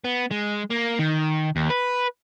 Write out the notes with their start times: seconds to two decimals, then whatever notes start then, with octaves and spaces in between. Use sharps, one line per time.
0.04 B3
0.31 G#3
0.70 A#3
0.99 D#3
1.56 D#2
1.70 B4